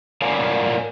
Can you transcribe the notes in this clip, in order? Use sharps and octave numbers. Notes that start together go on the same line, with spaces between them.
A#4 C#5 D5 F5 F#5 G#5